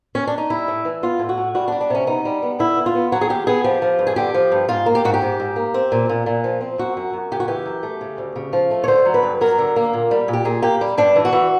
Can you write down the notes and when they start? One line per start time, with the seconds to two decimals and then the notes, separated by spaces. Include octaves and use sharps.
0.15 C#4
0.27 D4
0.38 D#4
0.50 G3 E4
0.68 A2
0.85 E3
1.03 B3 F4
1.19 A2
1.29 F#4
1.38 A2
1.55 G3 F#4
1.68 D4
1.72 G3
1.81 D4
1.90 C3 C#4
2.07 B3 D#4
2.25 G3
2.42 B3
2.59 D3 E4
2.77 B3
2.86 F4
2.95 B3
3.12 F#3 F#4
3.21 G#4
3.29 D#2 G4
3.47 B3 G#4
3.64 F3 G4
3.82 F3
3.99 G2
4.07 G#4
4.16 D3 G4
4.34 F3
4.52 G2
4.69 G#2 F4
4.86 A#3
4.95 G4
5.05 G#2 F#4
5.14 G4
5.22 G#2
5.40 G#2
5.56 A#3
5.74 C4
5.92 A#2
6.09 A#2
6.26 A#2
6.44 F3
6.61 C4
6.78 F#2 F#4
6.97 F#2
7.13 F#2
7.32 C#3 G4
7.40 F#4
7.48 E3 G4
7.66 F#2
7.83 A3
8.01 C#3
8.18 D2
8.36 C#3
8.53 F3
8.71 A3
8.84 C#5
8.88 D3 C5
9.05 F#3
9.14 B4
9.23 G2
9.41 F#3 A#4
9.59 D3
9.76 A#3
9.93 A#2
10.11 G3
10.28 A#2
10.33 G4
10.45 A#2 G#4
10.62 A#3 G4
10.81 G3
10.98 G2 D4
11.16 E3
11.25 F#4
11.33 E3